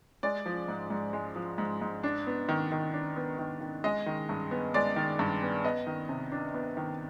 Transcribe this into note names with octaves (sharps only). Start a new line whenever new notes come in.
G#3 D5
F3
G#2
G#2
G#3
F3
G#2
G#2
D4
B3
D#3
D#3
D4
B3
D#3
D#3
G#3 D#5
D#3
G2
B3
G#3 D5
D#3
G2
B3
B3 D#5
D#3
C3
D4
B3
D#3